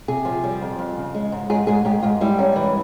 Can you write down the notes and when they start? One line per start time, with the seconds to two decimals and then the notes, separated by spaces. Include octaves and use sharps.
0.08 C3 G#4
0.25 F3
0.44 G3
0.61 F2
0.79 F2
0.97 C#3
1.15 G#3
1.32 G#2
1.50 G#2 G#4
1.67 G#2 G#4
1.85 G#2 G4
2.02 G#2 F4
2.21 G3 E4
2.38 G#2 C#4
2.56 E3 E4